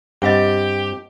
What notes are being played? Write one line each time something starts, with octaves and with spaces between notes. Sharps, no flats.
G2 C4 G4 D#5 F5 F#5